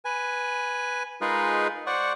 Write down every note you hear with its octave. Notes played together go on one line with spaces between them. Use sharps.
B4 G#5
G#3 D#4 F4 G#4 A#4 B4
C5 D5 F#5 C#6